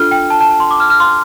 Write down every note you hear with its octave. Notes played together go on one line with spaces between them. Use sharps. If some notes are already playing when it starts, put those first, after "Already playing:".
Already playing: D4 F4 A4 F6
G5
A5
A5
A5
C6
D6
F6
F6
C6